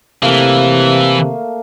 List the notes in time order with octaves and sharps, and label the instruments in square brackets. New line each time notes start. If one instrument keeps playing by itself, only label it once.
[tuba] C3 [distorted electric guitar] E3 [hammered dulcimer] A3 A#3 F5